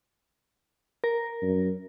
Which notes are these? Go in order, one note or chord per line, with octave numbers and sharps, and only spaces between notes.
A#4
F#2